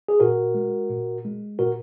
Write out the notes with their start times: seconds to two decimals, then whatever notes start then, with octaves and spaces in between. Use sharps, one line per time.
0.08 G#4
0.20 A#2 F#4 A#4
0.54 G#3
0.90 A#2
1.25 G#3
1.59 A#2 F#4 A#4